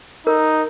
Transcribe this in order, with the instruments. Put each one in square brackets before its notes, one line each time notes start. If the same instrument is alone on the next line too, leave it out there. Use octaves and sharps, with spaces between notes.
[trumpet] D#4 [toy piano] A#4